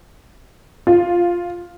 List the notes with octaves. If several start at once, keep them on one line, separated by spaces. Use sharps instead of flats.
F4